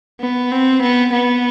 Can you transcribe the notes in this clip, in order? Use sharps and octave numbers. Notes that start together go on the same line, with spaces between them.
B3
C4
B3
B3